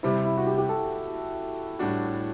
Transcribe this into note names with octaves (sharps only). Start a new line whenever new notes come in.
C3 G3 C4 E4
E4
F#4
G4
G4
A4
A2 G3 D4 F#4